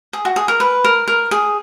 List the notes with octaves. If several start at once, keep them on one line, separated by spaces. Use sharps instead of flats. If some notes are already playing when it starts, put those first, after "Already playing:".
G#4
F#4
G#4
A#4
B4
A#4
A#4
G#4